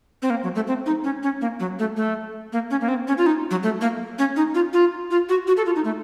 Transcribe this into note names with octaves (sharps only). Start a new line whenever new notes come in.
C4
A#3
F#3
A3
C4
D#4
C#4
C#4
A#3
F#3
A3
A3
A#3
C#4
A#3
C4
C#4
F4
D#4
F#3
A3
A#3
C#4
D#4
F4
F4
F4
F#4
F#4
A4
F4
D#4
A3